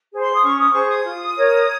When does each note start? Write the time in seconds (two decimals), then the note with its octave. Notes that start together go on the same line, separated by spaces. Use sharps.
0.11 G#4 C5
0.21 C6
0.32 D#6
0.41 C#4 C#6
0.57 D#6
0.72 G#4 C5 C#6
0.88 D#6
1.04 F4
1.35 A#4 C#5